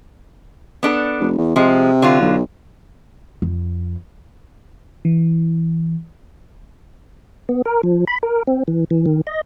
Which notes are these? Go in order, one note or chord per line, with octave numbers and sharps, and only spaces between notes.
B3 D4 A4
F1
E2
C3 F3 G#3
D3 F#3 F4
B1
F2
E3
B3
A#4
F3
B5
A#4
C4
E3
E3
D#3
D#5